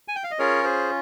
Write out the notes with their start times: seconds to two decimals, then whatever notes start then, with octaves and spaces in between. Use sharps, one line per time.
0.08 G#5
0.16 G5
0.24 F5
0.31 D#5
0.39 C#4 F4 G#4 A#4 C#5
0.64 G#4 C5